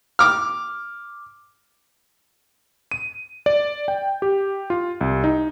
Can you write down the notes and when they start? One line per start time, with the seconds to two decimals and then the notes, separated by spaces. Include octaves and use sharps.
0.19 D6 F6
2.91 D#7
3.46 D5
3.88 G5
4.22 G4
4.70 F4
5.01 C2
5.24 D#4